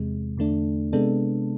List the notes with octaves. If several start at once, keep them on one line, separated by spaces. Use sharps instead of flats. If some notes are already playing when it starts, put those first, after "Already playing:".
Already playing: E2 C3 G#3
E2 D3 A3 D4
C3 G#3 B3 D4 A4